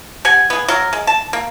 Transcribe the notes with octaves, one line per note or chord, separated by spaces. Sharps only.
G4 F#5 G#5
B3 G#4
F#3 A#4
G#3
A5
A#3